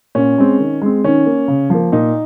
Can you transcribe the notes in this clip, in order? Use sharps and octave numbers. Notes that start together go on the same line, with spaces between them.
A#2 C#4
G#3 C4
D#3
G#3 C4
D#3 C#4
A#3
C#3
F3 A#3
A#2 D#4